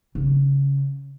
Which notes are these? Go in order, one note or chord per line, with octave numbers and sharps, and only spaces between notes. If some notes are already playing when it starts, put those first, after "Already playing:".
C#3